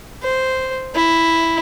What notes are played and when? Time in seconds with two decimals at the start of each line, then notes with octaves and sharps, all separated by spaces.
0.23 C5
0.95 E4